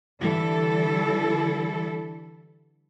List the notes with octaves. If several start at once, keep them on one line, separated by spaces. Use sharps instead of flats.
D3 E3 G3 E4 A4